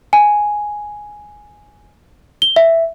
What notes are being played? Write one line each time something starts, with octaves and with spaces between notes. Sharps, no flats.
G#5
G7
E5